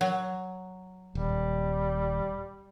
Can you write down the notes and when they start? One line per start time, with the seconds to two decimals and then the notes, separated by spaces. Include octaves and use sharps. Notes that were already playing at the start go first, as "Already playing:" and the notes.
0.01 F#3
1.15 D#1 G3